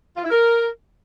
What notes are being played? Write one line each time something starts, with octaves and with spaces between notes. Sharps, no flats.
F4
E4
A#4